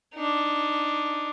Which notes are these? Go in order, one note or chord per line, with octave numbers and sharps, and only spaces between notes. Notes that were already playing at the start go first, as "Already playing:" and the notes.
D4 D#4